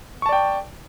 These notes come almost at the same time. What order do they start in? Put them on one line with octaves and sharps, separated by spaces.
C#6 A5 D5 G5